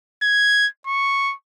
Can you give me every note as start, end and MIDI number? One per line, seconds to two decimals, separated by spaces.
0.23 0.67 92
0.86 1.34 85